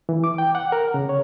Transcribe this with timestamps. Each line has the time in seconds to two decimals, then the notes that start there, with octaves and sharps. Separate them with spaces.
0.09 E3
0.24 D6
0.38 G5
0.55 F#5
0.72 A#4
0.94 C#3
1.09 C#5